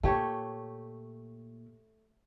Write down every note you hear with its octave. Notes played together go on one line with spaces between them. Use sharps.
A#2 A3 G4 C#5